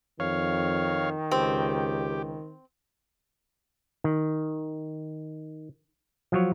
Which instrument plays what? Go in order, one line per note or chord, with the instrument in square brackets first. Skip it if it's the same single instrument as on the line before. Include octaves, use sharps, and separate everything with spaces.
[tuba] F2 [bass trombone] D#3 [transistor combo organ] C#5 F5
[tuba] C#2 [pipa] C4 [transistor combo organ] G4
[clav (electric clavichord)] D#3
F3 F#3 C#5